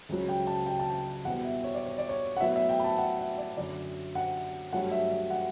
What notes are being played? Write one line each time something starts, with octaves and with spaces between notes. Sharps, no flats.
C#2 C#3 F#3
G5
A5
G5
A5
G5
E2 B2 G3 B3 F#5
E5
C#5
D5
C#5
D5
C#5
F#5
A2 F#3 B3 E5
E5
G5
B5
A5
F#5
E5
D5
F#2 D3 F#3 D5
F#5
G2 F#3 A3 F#5
E5
E5
F#5